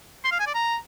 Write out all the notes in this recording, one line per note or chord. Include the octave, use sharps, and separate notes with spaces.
C6
F5
G#5
D5
A#5